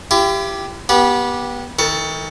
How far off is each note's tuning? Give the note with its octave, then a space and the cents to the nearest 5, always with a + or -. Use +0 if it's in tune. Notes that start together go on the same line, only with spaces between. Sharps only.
E4 +45 G4 +0
B3 -25 G4 +0
D#3 +40 A4 +25